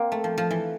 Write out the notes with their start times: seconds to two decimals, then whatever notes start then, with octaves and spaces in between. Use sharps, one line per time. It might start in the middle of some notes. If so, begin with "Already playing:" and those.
Already playing: A#3 C4
0.12 A3
0.24 F3
0.38 F3
0.51 E3